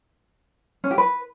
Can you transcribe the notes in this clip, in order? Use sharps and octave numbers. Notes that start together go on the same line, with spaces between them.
C#4
G4
B4